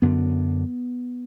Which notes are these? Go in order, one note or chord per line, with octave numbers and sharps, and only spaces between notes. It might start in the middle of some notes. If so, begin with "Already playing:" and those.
F#2 D3 B3